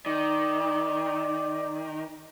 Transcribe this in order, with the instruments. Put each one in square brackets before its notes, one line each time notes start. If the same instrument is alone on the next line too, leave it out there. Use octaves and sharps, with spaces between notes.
[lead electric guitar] D#3 [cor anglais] D5